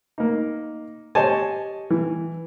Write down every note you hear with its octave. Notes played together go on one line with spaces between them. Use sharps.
A#3 D#4
G4 C5 C#5 D#5 G#5 A5
E3